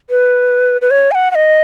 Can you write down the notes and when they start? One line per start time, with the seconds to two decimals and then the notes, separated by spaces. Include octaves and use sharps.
0.10 B4
0.81 B4
0.91 C#5
1.11 G#5
1.15 F#5
1.31 F#5
1.35 D#5